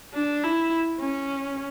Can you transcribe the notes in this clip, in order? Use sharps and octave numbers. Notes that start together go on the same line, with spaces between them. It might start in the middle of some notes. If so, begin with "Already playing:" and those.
D4
E4
C#4